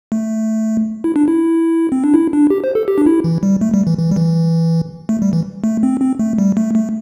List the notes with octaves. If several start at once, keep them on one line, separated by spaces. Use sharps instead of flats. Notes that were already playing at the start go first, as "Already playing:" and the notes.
A3
E4
D4
E4
C4
D4
E4
D4
G4
C5
A4
G4
D4
E4
E3
G3
A3
G3
E3
E3
G3
E3
A3
G3
E3
A3
C4
C4
A3
G3
A3
A3